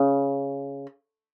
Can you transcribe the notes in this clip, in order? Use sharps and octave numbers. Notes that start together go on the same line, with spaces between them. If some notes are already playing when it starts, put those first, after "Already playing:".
Already playing: C#3